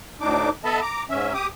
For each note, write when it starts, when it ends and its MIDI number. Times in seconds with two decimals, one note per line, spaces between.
0.21 0.49 38
0.21 0.49 45
0.21 0.49 62
0.21 0.49 63
0.21 0.49 86
0.65 0.80 59
0.65 0.80 69
0.65 0.80 75
0.65 0.80 76
0.65 0.80 81
0.65 0.80 83
0.82 1.03 82
0.82 1.03 86
1.09 1.33 44
1.09 1.33 61
1.09 1.33 76
1.34 1.47 67
1.34 1.47 86
1.34 1.47 87